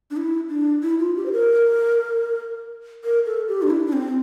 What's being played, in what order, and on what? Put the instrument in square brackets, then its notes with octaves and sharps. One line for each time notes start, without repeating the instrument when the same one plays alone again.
[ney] D4
E4
D4
E4
F4
G4
C5
A#4
A#4
A4
G4
D4
E4
D4
C4